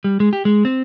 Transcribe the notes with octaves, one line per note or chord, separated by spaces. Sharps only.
G3
G#3
G4
G#3
C4